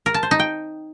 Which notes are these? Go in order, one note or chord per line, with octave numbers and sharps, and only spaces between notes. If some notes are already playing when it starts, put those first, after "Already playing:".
A#4
A5
C5
D#4
G5